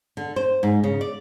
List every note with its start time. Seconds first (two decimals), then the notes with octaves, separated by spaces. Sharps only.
0.17 D3
0.36 C5
0.63 G#2
0.83 C#3
1.01 D5